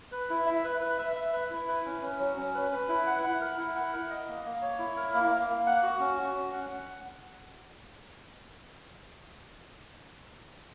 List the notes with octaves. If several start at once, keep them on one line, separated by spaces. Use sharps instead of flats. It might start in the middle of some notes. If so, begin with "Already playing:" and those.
B4
E4
E5
B4
B4
E5
E5
B4
E4
B4
C#4
C#4
F#3
C#4
B4
B4
E4
F#5
F#5
A#4
E4
F#5
A#4
D#5
A#3
A#3
C#5
E4
A#4
A#3
A#3
A#3
F#5
F#4
C#4
F#4
C#4
F#5
F#5